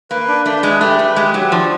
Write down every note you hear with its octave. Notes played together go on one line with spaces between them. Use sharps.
A#3 B4
D4
A3 D4
G#3 B4
A3 G4
A3 B4
G#3 G4
F#3 G4
F3 D4